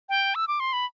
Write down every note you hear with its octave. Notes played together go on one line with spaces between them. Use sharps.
G5
E6
D6
C6
B5